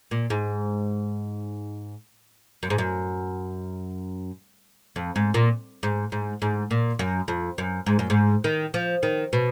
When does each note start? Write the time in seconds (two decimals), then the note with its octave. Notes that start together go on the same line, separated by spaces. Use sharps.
0.11 A#2
0.30 G#2
2.63 F#2
2.70 G#2
2.78 F#2
4.96 F2
5.16 G#2
5.34 A#2
5.83 G#2
6.12 G#2
6.42 G#2
6.71 A#2
6.99 F#2
7.28 F2
7.58 F#2
7.86 G#2
7.99 F#2
8.10 G#2
8.44 D#3
8.74 F3
9.03 D#3
9.33 B2